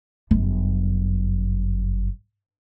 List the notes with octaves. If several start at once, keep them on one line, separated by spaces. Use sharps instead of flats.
G1 F#2